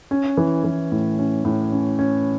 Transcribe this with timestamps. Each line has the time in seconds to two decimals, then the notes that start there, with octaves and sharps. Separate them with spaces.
0.11 C#4
0.37 E3
0.64 E3
0.92 A2
1.19 C#4
1.45 A2
1.72 C#4
1.99 C#4